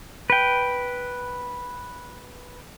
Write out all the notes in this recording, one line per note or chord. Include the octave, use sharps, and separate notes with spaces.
B4 G5